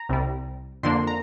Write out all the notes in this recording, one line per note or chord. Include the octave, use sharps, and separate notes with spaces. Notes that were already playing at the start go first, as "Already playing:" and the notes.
Already playing: A#5
C2 C3 G3
F2 D3 A#3 D4 C6
A#5